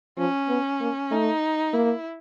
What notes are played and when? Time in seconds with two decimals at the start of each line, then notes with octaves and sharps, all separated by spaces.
0.18 F3 C#4
0.49 B3
0.80 A#3
1.11 A3 D#4
1.73 A#3 E4